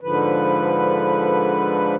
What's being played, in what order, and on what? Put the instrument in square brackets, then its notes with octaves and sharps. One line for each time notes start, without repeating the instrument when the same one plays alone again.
[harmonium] G#2 D3 F3 B4